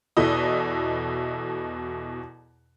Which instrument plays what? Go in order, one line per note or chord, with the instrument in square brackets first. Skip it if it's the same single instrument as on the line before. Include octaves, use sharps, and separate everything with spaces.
[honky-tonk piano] E2 B2 E4 A4 D#5 D#6